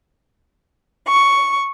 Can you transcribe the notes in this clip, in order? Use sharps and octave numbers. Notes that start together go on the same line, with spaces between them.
C#6